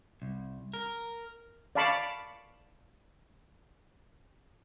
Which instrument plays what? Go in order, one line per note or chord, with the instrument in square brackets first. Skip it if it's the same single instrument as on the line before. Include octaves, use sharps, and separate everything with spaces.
[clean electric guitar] C2
A#4
[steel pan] D5 F5 A5 B5 C#6 D6